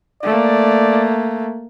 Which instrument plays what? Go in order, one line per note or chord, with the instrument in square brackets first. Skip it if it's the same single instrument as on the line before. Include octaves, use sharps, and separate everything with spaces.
[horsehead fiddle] A3 A#3 [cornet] D5